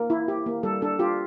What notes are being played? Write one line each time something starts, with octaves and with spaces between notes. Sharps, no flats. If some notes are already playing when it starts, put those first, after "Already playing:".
Already playing: A#3 A#4
E4
G4
A#3
G3 A4
D4 A4
F4 G4